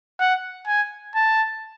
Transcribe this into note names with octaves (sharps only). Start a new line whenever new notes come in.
F#5
G#5
A5